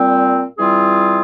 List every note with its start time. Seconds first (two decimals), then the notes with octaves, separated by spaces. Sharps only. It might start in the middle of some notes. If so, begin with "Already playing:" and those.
Already playing: A#2 G3 C4
0.58 E3 G3 C4 F4 G#4